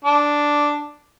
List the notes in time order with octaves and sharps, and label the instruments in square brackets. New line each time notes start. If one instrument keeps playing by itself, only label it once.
[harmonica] D4